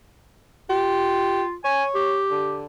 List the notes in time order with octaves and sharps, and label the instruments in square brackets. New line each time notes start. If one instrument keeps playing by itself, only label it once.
[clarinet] F4 [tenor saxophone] G4
[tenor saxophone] C#5 [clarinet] G#5
[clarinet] G4
[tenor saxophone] D3